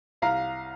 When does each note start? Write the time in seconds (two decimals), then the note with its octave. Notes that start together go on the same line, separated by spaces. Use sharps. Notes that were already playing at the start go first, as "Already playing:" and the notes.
0.22 C2 F5 A#5